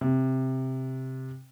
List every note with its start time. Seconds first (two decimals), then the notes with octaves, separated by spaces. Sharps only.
0.01 C3